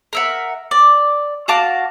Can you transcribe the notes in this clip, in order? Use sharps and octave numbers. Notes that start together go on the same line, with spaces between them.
A#4 E5 F#5
D5
F#4 F5 A5 D6